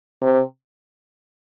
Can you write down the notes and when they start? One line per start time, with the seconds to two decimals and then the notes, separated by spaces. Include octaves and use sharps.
0.22 C3